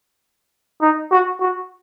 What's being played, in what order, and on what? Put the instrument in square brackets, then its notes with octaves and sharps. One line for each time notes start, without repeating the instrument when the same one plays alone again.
[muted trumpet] D#4
F#4
F#4